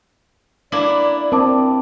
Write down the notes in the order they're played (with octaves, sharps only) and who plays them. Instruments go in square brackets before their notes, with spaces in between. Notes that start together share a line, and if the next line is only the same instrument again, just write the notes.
[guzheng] A#3 D4 E4 [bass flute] D5
[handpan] C4 [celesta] A#4 A5 D6